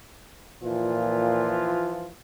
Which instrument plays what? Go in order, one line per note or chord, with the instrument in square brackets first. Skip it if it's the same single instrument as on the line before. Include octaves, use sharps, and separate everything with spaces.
[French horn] A#2 [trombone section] E3 F3 F4